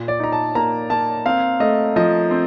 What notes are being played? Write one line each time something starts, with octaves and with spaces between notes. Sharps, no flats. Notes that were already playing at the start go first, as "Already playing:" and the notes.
Already playing: A#2
D5
D#4 A#5
A5
A#3 A#5
A#3 A5
C4 F5
A3 D#5
F3 D#5
C4